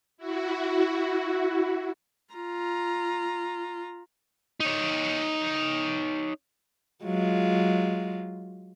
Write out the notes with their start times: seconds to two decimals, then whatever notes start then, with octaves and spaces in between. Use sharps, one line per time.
0.18 E4 F#4
2.35 F4 A#5
4.60 D#4 C#5
7.04 F#3 G#3 F4